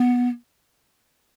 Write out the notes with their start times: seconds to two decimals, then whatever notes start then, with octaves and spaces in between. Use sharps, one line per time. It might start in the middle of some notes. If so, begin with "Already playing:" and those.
Already playing: B3